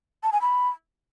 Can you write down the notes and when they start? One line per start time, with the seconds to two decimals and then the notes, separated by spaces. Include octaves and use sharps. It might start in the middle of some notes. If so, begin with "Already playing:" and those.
0.23 A5
0.32 G#5
0.42 B5